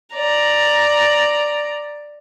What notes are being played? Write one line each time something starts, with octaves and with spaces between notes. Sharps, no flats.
D5 A#5